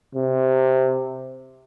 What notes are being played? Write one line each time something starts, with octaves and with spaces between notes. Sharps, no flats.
C3